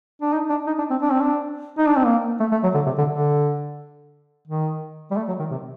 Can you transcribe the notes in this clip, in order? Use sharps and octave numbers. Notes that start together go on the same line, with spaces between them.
D4
D#4
D4
D#4
D4
C4
D4
C4
D4
D#4
D4
C4
A#3
A3
A3
F#3
D3
C3
D3
D3
D#3
G3
A3
F#3
D#3
C3